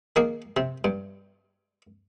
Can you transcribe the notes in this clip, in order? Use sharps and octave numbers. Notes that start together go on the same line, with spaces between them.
D#3 A#3 G#4
C3
G2